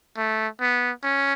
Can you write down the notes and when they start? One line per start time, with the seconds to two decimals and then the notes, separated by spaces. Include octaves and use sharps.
0.17 A3
0.61 B3
1.03 C#4